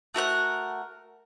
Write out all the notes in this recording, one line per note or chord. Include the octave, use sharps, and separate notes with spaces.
A3 F#4 A#4 F#6